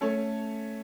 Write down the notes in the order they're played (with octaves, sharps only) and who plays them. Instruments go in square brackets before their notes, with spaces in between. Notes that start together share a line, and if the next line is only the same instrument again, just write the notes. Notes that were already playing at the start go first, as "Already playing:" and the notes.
[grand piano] A3 C#4 A4 C#5